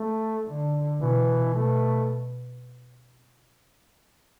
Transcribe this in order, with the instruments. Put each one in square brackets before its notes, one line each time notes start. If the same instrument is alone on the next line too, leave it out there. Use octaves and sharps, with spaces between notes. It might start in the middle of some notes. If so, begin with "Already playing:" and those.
Already playing: [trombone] A3
[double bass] D3
[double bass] B2 [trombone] E3
[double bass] B2 [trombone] A3